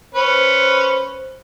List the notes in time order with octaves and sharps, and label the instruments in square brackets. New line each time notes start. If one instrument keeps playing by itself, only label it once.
[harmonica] C#4 B4 [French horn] C5